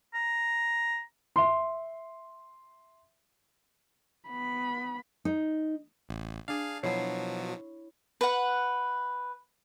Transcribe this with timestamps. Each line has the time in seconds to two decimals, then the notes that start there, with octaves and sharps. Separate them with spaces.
0.14 A#5
1.36 E5 C6
4.29 B3 B5
5.25 D#4
6.09 A1
6.48 D4 G#4 F5
6.83 B2 F3 F#3 E4 C#5 C7
8.21 B4 F#5